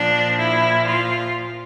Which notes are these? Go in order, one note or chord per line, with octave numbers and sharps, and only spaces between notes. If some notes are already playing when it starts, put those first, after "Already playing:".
Already playing: A#2 F3 D4
E4
F4